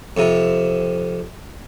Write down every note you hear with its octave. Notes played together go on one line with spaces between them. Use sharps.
F2 C3